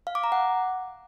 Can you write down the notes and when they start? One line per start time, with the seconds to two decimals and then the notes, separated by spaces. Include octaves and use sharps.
0.07 F5
0.15 D6
0.24 A#5
0.32 F#5